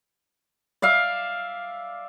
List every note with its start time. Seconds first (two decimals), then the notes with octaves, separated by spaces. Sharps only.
0.82 D5 E5 F5